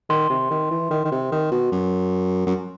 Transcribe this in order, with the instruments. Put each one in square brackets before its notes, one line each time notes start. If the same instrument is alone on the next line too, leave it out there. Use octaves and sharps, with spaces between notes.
[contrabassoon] D#3 [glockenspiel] C6
[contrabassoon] C3
D#3
E3
D#3
D#3
C3
D#3
B2
F#2
F#2